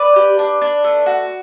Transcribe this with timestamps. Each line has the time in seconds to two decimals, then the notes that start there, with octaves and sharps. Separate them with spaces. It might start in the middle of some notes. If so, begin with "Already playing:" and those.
Already playing: B4 D5
0.16 G4
0.39 D4
0.62 D4
0.84 A3
1.06 F#4